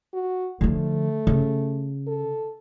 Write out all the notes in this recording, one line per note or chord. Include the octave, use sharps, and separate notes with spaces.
F#4
D3 F3 A3
C#3
A4